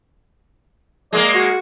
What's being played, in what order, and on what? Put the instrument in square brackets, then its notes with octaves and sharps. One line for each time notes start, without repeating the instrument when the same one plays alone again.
[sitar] G#3 A#3 [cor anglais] D5
[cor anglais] F#4